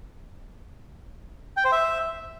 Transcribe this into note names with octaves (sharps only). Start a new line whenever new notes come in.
G5
C5
E5